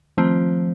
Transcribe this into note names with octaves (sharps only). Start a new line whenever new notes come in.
D#3 F3 A3 C4 F4